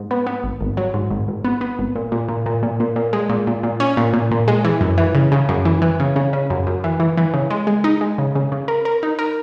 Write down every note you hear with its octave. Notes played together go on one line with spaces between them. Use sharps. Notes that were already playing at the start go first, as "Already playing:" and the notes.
Already playing: G#2
B3
B3
G#1
G#1
F#3
G#2
G#1
G#1
B3
B3
G#1
A#2
A#2
A#2
A#2
A#2
A#2
A#2
G#3
A#2
A#2
A#2
C#4
A#2
A#2
A#2
G#3
E3
F#2
E3
C#3
C#3
F#2
E3
E3
C#3
C#3
C#3
F#2
F#2
E3
E3
E3
C#3
G#3
G#3
D#4
G#3
C#3
C#3
C#3
A#4
A#4
D#4
A#4